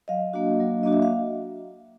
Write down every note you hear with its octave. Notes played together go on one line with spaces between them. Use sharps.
F#3 D#5 F5
A#3 D4 F#4
F#3
A#3 D4 F#4 D#5
E5
F5